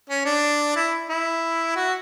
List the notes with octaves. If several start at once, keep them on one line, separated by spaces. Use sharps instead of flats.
C#4
D4
E4
E4
F#4